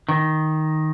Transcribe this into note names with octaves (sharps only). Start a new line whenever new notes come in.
D#3